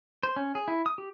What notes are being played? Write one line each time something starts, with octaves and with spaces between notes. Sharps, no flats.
C5
C#4
G#4
E4
D#6
G4